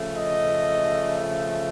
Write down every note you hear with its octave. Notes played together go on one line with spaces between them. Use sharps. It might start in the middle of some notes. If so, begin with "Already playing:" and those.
Already playing: C#3 F3 A3
D#5